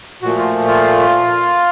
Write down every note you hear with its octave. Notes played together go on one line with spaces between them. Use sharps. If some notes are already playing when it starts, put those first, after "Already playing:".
A#2 F3 A3 F#4
F4
F4